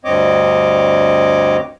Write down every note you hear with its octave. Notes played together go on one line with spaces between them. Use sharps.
D2 G2 C4 C#5 D#5 D6